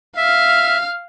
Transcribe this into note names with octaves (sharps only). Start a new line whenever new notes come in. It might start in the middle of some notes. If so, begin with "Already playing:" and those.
E5 F5 F6